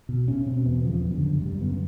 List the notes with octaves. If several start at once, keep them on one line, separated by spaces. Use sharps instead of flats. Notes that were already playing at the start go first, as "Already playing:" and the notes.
B2
B2 C#4
B2 C4
E2 B3
C#3 F3
F#2
D3
F#2
F#2 G3
C#3 B3